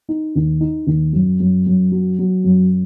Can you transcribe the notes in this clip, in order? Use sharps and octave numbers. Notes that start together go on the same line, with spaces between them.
D#4
D#2
D#4
D#2
F#2
F#2
F#2
F#3
F#3
F#2